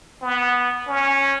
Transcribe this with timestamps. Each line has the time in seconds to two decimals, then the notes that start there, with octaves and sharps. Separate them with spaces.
0.22 B3
0.88 C#4